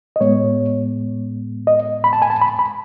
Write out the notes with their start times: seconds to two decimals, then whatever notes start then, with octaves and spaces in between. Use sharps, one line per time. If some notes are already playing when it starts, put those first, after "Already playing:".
0.16 D#5
0.20 A2 G#3 B3 C#5
1.67 D#5
2.04 B5
2.13 A5
2.22 G#5
2.30 A5
2.41 B5
2.59 B5